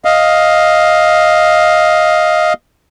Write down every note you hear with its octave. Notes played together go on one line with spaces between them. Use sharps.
D#5 F5